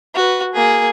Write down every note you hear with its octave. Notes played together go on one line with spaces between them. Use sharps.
F#4 B4
A#3 G#4